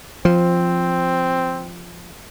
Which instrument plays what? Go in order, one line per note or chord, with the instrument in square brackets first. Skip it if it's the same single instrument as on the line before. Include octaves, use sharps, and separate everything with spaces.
[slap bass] F3 [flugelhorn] C4